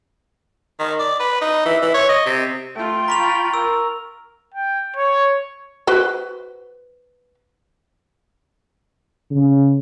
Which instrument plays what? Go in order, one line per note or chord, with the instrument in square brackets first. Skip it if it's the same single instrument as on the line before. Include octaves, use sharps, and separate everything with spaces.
[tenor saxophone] D#3
D5
B4
D#4
E3
E3
C#5
D#5
C3
[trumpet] A3 [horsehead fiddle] F4 G5
[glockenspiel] A#5 C#6 F7 [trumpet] B5
[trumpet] A#4 [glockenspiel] E6
[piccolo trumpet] G5
C#5
[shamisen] F#4 B4 C5
[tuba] C#3